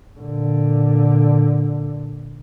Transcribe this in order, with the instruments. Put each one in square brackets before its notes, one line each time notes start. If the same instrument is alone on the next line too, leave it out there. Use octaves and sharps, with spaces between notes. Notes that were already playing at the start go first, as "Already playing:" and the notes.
[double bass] A#2 D3